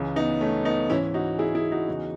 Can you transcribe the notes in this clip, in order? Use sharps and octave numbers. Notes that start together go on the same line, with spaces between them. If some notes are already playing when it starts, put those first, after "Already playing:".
Already playing: C#2 C#3 E3
B3 D#4
A3 C#4
B3 D#4
G#2 E3 C#4 E4
D#4 F#4
E4 G#4
E4 G#4
D#4 F#4
E2 C#3 E3